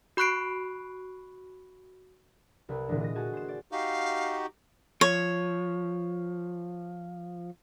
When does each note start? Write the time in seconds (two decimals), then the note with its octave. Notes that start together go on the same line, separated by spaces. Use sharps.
0.17 F#4 B5 C#6 F#6 C7 D7
2.69 C2 B4
2.88 A#2 D3 E3 G#3 D4
3.00 D#5 A#6
3.15 F#4 G#4 G#5 A5
3.33 C5 E7
3.49 D5
3.72 D#4 F#4 G4 F5
5.01 F3 C#5